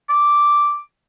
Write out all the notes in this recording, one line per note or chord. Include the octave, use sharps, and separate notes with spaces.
D6